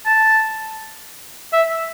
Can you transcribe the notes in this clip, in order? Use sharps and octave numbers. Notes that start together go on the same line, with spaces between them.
A5
E5